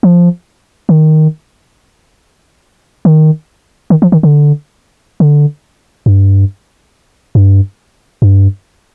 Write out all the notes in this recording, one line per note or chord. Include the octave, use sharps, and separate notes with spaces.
F3
D#3
D#3
D#3
F3
D#3
D3
D3
G2
G2
G2